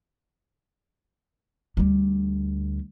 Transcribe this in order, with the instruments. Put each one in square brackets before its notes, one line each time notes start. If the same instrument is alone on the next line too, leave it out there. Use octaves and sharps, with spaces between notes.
[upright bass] D2 G3